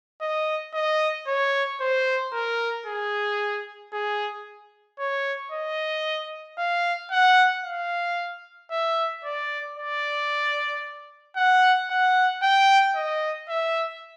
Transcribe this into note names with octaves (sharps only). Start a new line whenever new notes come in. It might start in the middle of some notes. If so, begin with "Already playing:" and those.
D#5
D#5
C#5
C5
A#4
G#4
G#4
C#5
D#5
F5
F#5
F5
E5
D5
D5
F#5
F#5
G5
D#5
E5